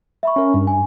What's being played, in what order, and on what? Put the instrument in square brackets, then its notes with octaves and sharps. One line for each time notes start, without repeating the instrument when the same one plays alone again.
[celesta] E5 B5 C#6
[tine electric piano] C#4 A#4
G2
[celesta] G#5